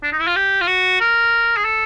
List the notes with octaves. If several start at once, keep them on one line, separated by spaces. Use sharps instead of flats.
D4
D#4
E4
F4
G4
F4
F#4
A#4
G#4
A4